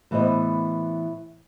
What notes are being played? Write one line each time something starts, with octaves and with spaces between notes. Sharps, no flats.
A2 E3 B3 G#4 C5 D#5